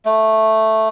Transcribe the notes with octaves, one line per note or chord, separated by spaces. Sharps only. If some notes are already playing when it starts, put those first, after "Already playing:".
A3